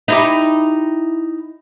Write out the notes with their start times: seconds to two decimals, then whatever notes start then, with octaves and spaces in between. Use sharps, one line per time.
0.08 D#4 E4 G4